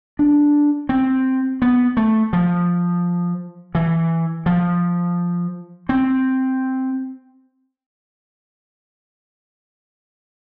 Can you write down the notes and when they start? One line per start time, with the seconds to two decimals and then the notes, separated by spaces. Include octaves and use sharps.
0.19 D4
0.89 C4
1.62 B3
1.97 A3
2.33 F3
3.75 E3
4.46 F3
5.89 C4